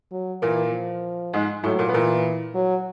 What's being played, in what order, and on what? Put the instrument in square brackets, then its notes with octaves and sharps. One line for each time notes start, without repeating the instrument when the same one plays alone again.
[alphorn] F#3
[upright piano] A#2 A#3 [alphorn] E3
[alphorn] F3
[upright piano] G#2 G#3
[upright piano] A2 A3 [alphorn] F#3
[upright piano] A#2 A#3
B3
[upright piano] A#2 A#3 [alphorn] E3
[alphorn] F#3